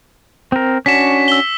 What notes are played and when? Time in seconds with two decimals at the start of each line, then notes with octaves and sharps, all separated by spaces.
0.52 C4 A#4
0.86 C#4 D4 F#4 B6 E7
1.28 E6 G7